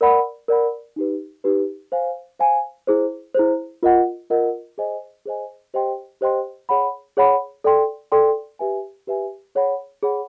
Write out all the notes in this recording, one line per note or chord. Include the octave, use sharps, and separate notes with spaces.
A#4 D5 F#5 B5
A#4 D5 F#5 B5
D#4 G4 B4
D#4 G4 B4
C5 F5 G#5
C5 F5 G#5
E4 G#4 C5
E4 G#4 C5
F4 A#4 D#5 F#5
F4 A#4 D#5 F#5
G#4 C5 D#5 G#5
G#4 C5 D#5 G#5
G4 C5 D#5 G5 C6
G4 C5 D#5 G5 C6
G#4 C#5 F#5 B5
G#4 C#5 F#5 B5
A4 D5 G5 C6
A4 D5 G5 C6
G4 B4 E5 G#5
G4 B4 E5 G#5
G#4 C#5 F#5 B5
G#4 C#5 F#5 B5